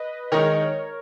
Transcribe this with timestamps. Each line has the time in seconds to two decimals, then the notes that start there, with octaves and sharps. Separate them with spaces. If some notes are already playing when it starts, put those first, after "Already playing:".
Already playing: B4 D#5
0.32 D#3 G#3 D#4 A#4 C#5